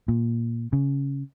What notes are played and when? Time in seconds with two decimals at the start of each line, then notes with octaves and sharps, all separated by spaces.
0.08 A#2
0.73 C#3